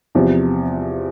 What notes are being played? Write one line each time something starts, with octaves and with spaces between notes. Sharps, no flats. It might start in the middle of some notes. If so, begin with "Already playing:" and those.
E2 C3 F3